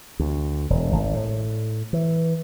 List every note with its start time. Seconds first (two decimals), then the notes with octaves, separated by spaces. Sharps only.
0.19 D2
0.70 E1
0.92 G#1
1.14 A2
1.93 E3